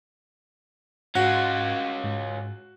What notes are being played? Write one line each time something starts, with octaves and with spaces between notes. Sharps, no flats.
G#2 C#4 F4 F#4
G#2